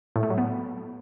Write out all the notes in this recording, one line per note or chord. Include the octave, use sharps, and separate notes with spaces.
A2
A3
F#3
B3